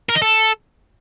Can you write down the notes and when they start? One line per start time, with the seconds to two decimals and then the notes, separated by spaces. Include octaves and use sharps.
0.09 A#4
0.16 D#5
0.22 A4